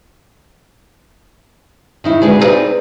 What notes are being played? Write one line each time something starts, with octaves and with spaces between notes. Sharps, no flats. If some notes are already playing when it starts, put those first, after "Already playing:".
D#3 D#4 E4
D3 G#3 B3 D4 F#4 B4
C4 D#4 F4 A#4 B4 D5